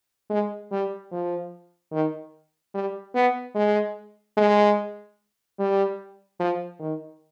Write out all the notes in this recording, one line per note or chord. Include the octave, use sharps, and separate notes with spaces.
G#3
G3
F3
D#3
G3
B3
G#3
G#3
G3
F3
D#3